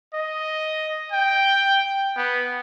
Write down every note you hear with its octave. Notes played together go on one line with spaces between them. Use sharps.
D#5
G5
B3